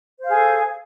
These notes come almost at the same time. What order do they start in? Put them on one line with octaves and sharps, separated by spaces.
C5 F5 G#4 A4